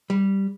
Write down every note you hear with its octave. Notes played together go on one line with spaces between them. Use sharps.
G3